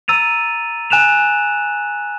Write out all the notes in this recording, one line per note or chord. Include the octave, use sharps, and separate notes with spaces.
A#5 E6 A6 D#7 F7
G#5 F#6 E7 F7